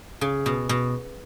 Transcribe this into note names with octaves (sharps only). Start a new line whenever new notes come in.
C#3
B2
B2